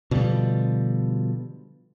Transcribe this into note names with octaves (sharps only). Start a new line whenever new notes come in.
B2 D3 F3 G3